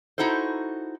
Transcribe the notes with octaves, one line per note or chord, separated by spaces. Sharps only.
D#4 E4 F#4 A4 C5